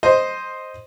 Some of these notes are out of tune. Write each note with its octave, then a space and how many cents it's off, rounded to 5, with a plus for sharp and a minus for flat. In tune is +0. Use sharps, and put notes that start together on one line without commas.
C5 +0 D#5 +0